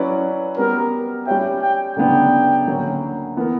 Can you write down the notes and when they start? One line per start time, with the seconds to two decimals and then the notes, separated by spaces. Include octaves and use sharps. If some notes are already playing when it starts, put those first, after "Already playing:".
Already playing: F#3 C#4 E4 B4 D5
0.57 G3 B3 F#4 A#4 B4
1.27 G3 C#4 G4 C#5 E5 G5
1.62 G5
1.96 D2 C#3 F#3 B3 D4 G5
2.66 D2 D3 F#3 A#3 C#4
3.36 E3 B3 E4 A#4